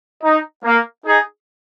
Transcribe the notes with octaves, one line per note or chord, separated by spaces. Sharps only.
D#4
A#3
D#4 G#4